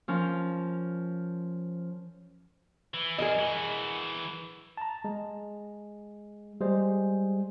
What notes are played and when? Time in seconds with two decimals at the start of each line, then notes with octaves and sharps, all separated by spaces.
0.08 F3 C#4 A#4
2.94 E3
3.18 F#2 G#4 A#4 D#5
3.39 E3 F#4
4.77 A5 A#5
5.04 G#3
6.61 G3 G#3 G#4 C5